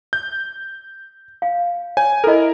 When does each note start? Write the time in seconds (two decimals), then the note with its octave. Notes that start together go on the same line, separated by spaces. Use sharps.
0.13 G6
1.42 F5
1.97 C#5 G#5
2.24 E4 A4 A#4 D#5